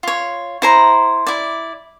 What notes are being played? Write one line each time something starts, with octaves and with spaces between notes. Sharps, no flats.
F4 C#5
E4 C5 A#5
E4 D5